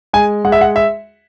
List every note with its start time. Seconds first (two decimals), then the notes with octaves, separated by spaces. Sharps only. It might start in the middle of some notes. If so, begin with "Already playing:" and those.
0.13 G#3 G#5
0.45 G#3 F#5
0.52 E5
0.61 F#5
0.76 E5